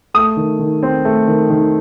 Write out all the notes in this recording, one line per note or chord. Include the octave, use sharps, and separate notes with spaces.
A3 D#6
D#3
D#3
C4
A3
D#3
D#3